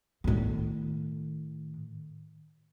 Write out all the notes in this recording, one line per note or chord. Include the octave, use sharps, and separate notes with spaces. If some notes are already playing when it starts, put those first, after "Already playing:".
A2 D#3